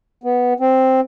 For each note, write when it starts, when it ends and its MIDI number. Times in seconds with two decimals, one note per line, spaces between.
0.24 0.53 59
0.60 1.00 60